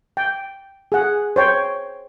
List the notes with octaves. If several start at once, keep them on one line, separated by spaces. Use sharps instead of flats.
G5
G#4 F#5
C5 C#5 G5